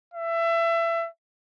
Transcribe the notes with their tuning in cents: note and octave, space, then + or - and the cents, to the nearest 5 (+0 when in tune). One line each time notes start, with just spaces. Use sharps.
E5 +25